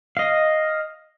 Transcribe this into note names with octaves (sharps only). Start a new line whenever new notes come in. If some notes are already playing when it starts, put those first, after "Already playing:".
D#5 F5